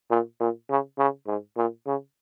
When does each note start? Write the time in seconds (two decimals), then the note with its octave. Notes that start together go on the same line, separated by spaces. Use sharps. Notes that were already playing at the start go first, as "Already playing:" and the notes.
0.11 A#2
0.40 A#2
0.70 C#3
0.98 C#3
1.27 G#2
1.57 A#2
1.86 C#3